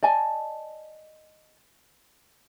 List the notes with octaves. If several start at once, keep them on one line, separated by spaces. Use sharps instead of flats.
D5 D#5 G#5 A5